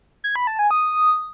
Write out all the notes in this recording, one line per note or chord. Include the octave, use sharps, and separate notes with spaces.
G#6
B5
A5
G#5
D#6